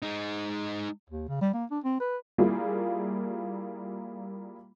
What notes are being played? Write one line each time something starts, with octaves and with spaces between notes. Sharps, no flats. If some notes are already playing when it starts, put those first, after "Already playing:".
G#3 D#4
D#2
C#3
G3
A#3
D4
C4
B4
G3 A#3 E4 F4 G#4